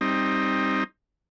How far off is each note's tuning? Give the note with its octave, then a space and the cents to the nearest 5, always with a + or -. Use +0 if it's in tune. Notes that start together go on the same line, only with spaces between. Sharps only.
G3 +15 C4 +15 D#4 +0